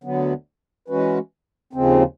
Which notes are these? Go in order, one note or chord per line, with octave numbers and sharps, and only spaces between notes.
D2 D3 F#3 B3
E3 G#3 C#4 F#4 B4
D#2 C#3 F3 G#3 C4